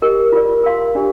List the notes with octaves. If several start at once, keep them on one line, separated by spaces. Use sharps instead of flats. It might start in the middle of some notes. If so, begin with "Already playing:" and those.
G4 A#4 D#5
F4 A#4 D5
A#4 F5 C6
D4 G4 D5